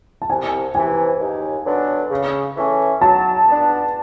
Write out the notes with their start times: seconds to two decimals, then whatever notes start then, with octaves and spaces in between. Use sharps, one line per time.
0.22 A5
0.29 C2 G#5
0.75 C3 E3 G#5
1.20 D#2
1.66 D3 F#3 B3 D4
2.11 C#3
2.56 E3 A3 C#4
3.01 F#3 A5
3.47 B3 D4